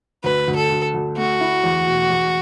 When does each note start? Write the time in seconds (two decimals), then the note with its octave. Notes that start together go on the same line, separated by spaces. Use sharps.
0.24 D2 B4
0.48 D2
0.56 A4
0.70 D2
0.94 D2
1.17 A3 F#4
1.41 E4
1.64 E2
1.87 B2
2.10 E2